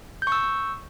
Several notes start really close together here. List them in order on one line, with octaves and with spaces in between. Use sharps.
G6 C#6 E6